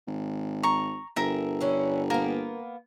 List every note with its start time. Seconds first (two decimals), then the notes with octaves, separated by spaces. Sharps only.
0.07 G#1
0.63 A#5 C#6
1.16 G1 A#4 E5
1.61 D3 C#4 E4
2.10 A#3 B3 A#4